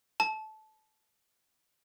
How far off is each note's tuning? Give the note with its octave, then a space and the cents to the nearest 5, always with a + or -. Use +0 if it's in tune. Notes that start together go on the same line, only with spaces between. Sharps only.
A5 -20